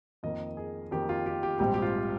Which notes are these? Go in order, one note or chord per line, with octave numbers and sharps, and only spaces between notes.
F2 D#3 A#3 D#5
G#4
F2 D#3 A#3 G4
F4
G4
G4
A#1 G#2 G3 C4 G4
G4
F4